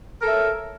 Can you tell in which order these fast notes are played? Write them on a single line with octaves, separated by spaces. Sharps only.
A#4 A4 E5 C#5